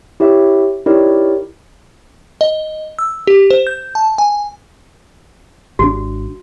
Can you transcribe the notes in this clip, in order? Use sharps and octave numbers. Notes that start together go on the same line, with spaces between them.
E4 G4 C#5 E5
D#4 E4 G4 A#4 C#5 D5
D#5
E6
G4
C5
G6
A5
G#5
G#1 C#3 D4 F#4